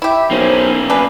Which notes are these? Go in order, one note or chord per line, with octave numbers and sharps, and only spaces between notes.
E4 G4 E5
B1 A#3 C#4 C5
D4 B4 G#5